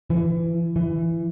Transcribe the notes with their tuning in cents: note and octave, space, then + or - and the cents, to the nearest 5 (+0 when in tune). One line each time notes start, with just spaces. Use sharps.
E3 +30
E3 +15